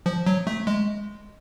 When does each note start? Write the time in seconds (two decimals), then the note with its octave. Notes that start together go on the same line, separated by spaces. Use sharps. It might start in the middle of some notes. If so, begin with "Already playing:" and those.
0.06 F3
0.26 F#3
0.47 A3
0.67 G#3